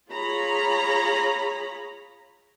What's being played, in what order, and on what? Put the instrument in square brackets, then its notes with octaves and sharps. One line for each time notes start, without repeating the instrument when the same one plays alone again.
[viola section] F4 G#4 C#5 A#5 B5